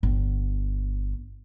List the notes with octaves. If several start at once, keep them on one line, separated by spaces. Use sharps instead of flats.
G1